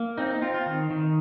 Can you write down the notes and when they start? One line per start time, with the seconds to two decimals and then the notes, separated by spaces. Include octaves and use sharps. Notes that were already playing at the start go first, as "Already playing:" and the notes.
Already playing: A#3
0.18 C4 D#4
0.31 D#4
0.42 C4 F4
0.54 F4
0.66 D#3
0.90 D#3